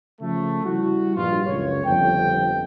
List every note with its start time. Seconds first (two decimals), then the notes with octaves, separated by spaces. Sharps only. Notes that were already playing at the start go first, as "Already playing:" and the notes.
0.21 C#3 F3 A3
0.65 G3 E4 F#4
1.16 A#1 G2 F4
1.46 F#1 C#2 C#5
1.85 G1 F2 G5